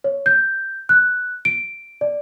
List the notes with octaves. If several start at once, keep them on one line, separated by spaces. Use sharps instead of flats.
C#5
G6
F#6
D7
D5